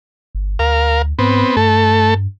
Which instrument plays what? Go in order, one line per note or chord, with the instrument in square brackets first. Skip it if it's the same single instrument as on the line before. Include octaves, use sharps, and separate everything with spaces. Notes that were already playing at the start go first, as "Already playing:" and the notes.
[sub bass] G1
[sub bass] D2 [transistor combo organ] A#4 F5
[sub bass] G#2 [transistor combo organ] B3 C4
[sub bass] G2 [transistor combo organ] A3 A4